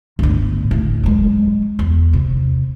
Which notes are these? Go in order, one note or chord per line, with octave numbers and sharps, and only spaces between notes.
G1 A2
D#2 A2
F#3 G#3
E2
C3